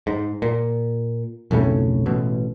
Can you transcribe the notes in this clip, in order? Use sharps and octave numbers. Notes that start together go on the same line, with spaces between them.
G#2
A#2
B1 F2 A2 C#3
A1 B2